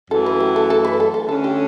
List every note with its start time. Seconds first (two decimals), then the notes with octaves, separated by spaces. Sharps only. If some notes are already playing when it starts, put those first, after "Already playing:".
0.11 F#2 E3 A3 A4
0.26 B4
0.40 G4
0.56 A4
0.70 A4
0.85 B4
1.00 A4
1.14 A4
1.29 D3 A3 C#4 A4
1.44 G4